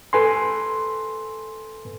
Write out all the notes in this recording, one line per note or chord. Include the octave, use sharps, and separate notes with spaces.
A4 B4 G#5 C6